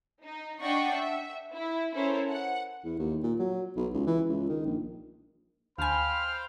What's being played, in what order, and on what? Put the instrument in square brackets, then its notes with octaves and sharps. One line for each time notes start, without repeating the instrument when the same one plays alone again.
[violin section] D#4
D4 D5 D#5 F#5 G5 C#6
E5
E4
C#4 E4 A4 A#4 C5 C#5
F#5
[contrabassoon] E2
D#2
A#2
F#3
B1
C#2
E3
C#2
D#3
A#1
[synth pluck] D2 G#5 [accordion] C5 F5 G5 [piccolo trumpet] B5 [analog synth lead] F6